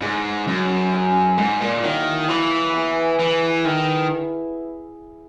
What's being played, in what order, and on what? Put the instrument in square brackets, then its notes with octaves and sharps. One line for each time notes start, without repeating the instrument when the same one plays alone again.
[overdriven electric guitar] G#2 [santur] D#4 G#4 D#5
[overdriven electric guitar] F#2
[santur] G#3 C#4 G#4 D#5
[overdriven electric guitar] G#2
A#2
[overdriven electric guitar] D#3 [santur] F#3 A#3 E4
[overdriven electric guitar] E3
[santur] B3 E4 G#4
[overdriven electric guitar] E3
[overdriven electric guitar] D#3 [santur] E4 B4 E5